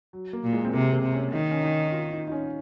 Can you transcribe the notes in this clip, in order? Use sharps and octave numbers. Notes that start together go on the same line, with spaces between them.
F#3
A#3
A#2
G#3
C4
C3 A#3
A#3
C3
C#4
D#3 D#4
C#4
D#4
F4
D#4
D#4
C#4